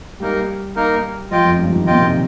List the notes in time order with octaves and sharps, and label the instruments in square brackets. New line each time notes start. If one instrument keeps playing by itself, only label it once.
[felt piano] G3 [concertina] A#3 D#4 A#4
[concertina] A#3 D#4 A#4
[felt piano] F3 [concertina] F4 D#5 G5
[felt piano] F2
G2
F3
D#3
[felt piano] A#2 [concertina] F4 D#5 G5
[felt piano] C3
D#3